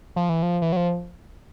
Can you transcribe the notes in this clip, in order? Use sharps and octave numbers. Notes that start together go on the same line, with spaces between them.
F3
E3
F3
E3
F#3
F3